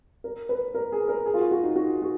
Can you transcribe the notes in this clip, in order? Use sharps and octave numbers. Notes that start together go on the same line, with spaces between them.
A#4
B4
A#4
G#4
A#4
G#4
F4
F#4
F#4
D#4
F#4
F#4